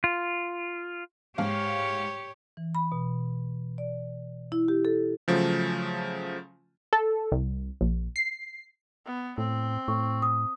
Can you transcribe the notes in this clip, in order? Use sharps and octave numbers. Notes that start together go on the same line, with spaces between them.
F4
G#2 G4 C#5 F5
E3
B5
B2
D5
E4
G4
A4
C#3 F3 F#3 A3
A4
C2
A#1
C7
B3
A2 C4
A2 C#6
D#6